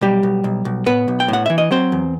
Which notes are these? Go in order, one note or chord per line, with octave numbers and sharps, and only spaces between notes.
B1 G3 G4
B1
B1
B1
A2 B3 B4
B1
G5
A2 F#5
E3 E5
D#5
F#3 C4 C5
E2